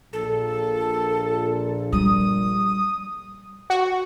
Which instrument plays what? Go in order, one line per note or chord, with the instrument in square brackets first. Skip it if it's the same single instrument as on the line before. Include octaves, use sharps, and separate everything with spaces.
[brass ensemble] A#1 A#2 [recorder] A4
[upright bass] G3 [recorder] D#6
[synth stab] F#4